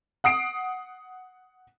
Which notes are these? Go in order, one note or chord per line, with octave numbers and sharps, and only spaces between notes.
F#5 D#6 C7 D7